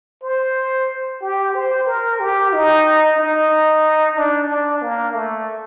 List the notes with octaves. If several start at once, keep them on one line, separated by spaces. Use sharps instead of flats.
C5
G4
C5
A#4
G4
D#4
D#4
D4
D4
A#3
A3